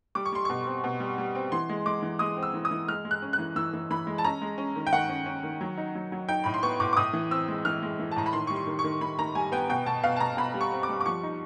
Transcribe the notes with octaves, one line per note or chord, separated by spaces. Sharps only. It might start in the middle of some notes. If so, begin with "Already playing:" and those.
G3 D6
C#6
G3 C6
B2 C#6
C4
B2
G3
G3
C4
E3 C6
G#3
G#3 D6
E3
G#3 D#6
C4
E6
E3
D#6
E3
G#3 F6
G#3
F#6
C#4
F#6
E3
E3 E6
E3
E3 B5
G#3
A5
C#4 A#5
G#3
C#4
D#3
G5
D#3 F#5
C#4
C#4
D#3
F#3
D#4
F#3
F#3
D#4 G5
A2 B5
C6
B3 C#6
A2 D6
D6
A2 D#6
E3
C4 E6
G#3
E3 F6
G#3
E3
A5
A2 A#5
B5
D#3 C6
G3 C#6
C6
D#3
C#6
D#3
D#3 B5
D#3 A#5
G3 G#5
B3 G5
B2 G5
B2 A5
B2 F5
A5
B2 A#5
B2 B5
G3
C#6
C4
D6
G3
D6
F3 C#6
D#4